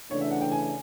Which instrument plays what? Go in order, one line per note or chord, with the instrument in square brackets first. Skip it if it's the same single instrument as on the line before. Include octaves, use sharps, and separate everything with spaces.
[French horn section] C#3 E3 A3 D4 [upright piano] C#5
[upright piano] E5
F#5
G5
G#5